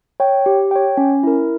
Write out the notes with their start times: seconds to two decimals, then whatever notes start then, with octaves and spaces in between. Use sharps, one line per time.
0.20 C#5 G5
0.46 G4
0.71 C#5 G5
0.97 C#4
1.23 E4 A#4